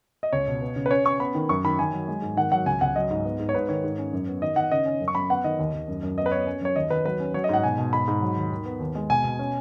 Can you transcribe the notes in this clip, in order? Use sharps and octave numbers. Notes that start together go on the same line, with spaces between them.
D#5
C#2 C#5
B2
B3
C#3
B4
C#4 C#5
C#4 C#6
B3 B5
D#3
F#2 C#6
D#3 B5
D#3 G#5
F#3
G#3
G#2
D#3 F#5
F#3 F#5
C#2 G#5
C#2 F#5
F#3 D#5
G#2
B3
G#2
C#5
G#2 B4
D#3 C#5
G#2
C#4
F#2
B3
D#3 D#5
D#3 F#5
C#3 D#5
C#4
F#2
C#6
F#2 B5
B3 F#5
D#3 D#5
D#2
D#2
F#2
F#2
B3 D#5
B4
B3 C#5
C#4
F#2 C#5
D#2 D#5
D#2 B4
F#3 B4
C#4
F#3 C#5
D#5
G#2 F#5
B2 G#5
B2
G#2 B5
G#2
F#3
D#2
D#3
B3
D#2
G#3
B2 G#5
B2
C#4